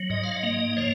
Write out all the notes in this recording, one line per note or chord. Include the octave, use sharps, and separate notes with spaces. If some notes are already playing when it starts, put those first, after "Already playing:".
Already playing: F#3
G#2 D#5
F5
D#5
A#3
F3 C#5